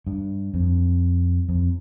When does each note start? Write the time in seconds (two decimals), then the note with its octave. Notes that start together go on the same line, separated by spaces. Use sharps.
0.07 G2
0.54 F2
1.49 F2